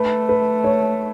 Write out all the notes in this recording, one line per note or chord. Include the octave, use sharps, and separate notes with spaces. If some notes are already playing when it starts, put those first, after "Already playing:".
Already playing: A3 B4
B4
C#5